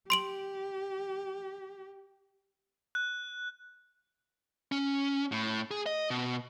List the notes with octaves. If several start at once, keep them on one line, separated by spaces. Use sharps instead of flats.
G4 C6 D7 F#7
F#6
C#4
A2
G#4
D#5
B2